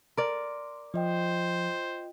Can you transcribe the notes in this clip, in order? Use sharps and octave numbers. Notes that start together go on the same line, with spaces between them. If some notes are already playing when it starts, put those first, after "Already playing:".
A#4 D5 C6
F3 F4 C5 D#5 G5